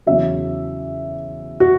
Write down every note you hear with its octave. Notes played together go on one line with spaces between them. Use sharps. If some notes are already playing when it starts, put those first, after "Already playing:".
E2 C#3 F#3 E5
F#4